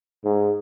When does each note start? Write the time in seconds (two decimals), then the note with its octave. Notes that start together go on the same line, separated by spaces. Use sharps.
0.24 G#2